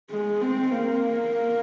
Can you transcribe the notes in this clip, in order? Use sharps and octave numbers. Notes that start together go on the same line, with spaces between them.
G#3
C4
A#3